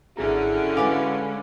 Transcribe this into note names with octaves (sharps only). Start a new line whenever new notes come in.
G#1 D3 C#4 E4 F#4 G#4 A#5
G#3 B4 F5 G#5 D6